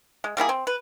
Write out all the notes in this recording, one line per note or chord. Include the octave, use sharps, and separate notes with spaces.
G#3
G3 A#3 E4 G#4
C4
B4